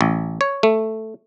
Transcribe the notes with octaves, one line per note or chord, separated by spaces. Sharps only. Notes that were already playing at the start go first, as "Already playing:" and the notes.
A1
C#5
A3